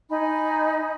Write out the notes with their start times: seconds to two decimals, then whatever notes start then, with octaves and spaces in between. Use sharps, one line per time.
0.09 D#4 G#5 B5